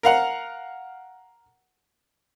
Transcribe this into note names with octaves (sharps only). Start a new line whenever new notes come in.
A#4 F5 F#5